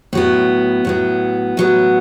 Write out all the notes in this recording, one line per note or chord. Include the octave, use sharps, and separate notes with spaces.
A2 F#3 B3
A2 F#3 B3
A2 F#3 B3